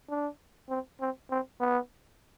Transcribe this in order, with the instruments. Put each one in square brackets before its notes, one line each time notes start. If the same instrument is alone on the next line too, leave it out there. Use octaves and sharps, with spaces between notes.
[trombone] D4
C4
C4
C4
B3